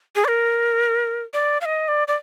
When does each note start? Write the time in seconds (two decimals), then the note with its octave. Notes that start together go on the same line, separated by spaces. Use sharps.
0.15 G#4
0.25 D5
0.28 A#4
1.33 D5
1.61 F5
1.65 D#5
1.88 D5
2.08 D5